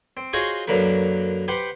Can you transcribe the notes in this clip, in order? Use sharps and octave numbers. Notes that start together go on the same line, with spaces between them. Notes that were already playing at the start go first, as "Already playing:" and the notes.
C4
F4 F#4 G#4 C5 C#5 D#5
F#2 D3 F#3 A#3 B4
G4 B4 C5 F#5